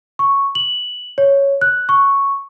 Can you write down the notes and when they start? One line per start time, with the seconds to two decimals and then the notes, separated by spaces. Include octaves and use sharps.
0.19 C#6
0.55 F#7
1.18 C#5
1.61 F#6
1.89 C#6